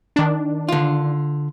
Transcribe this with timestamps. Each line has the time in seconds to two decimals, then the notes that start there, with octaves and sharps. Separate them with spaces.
0.16 D#3 D4
0.69 D3 F4